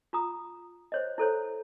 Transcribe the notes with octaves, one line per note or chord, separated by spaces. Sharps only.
F4 A#5 D#6
C5 C#5 D#5
E4 A4 C5 C#5